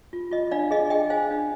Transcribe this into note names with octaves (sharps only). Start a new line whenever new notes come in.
F4
F4 D#5
D4 D5 F5
G#4 D#5
G#4 D#5 G5
C5 F5 G#5
D4